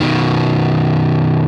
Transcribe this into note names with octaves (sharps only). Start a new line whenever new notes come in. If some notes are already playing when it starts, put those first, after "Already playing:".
B2 D#3